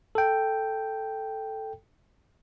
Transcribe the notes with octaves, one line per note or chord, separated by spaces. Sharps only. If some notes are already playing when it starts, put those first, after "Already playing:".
A4 G5